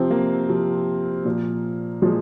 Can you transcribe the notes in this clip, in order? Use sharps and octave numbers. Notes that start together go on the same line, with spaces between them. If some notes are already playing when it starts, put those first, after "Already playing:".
Already playing: C3 F3 C4
A#3
C3 F3
A#2 F3
A#2 F3 G#3